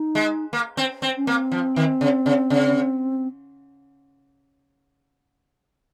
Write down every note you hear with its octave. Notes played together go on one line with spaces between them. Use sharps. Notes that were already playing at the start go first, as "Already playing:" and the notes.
Already playing: D#4
G#3
A#3
C4
C4
C#4
A#3 C4
F3
D#3
C#3
C#3
C#3